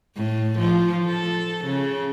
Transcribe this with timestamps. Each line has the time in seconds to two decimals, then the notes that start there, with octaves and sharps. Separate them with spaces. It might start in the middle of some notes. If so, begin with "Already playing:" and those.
0.16 A2
0.60 F3
1.06 A4
1.65 C#3